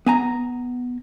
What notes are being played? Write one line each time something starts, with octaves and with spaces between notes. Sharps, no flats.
B3 G#5 A#5